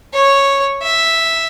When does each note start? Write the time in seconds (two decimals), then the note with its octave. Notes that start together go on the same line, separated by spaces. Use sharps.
0.14 C#5
0.82 E5